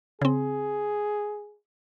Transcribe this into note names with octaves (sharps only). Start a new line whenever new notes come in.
C#3 C4 G#4